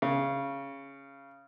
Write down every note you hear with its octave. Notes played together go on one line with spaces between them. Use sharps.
C#3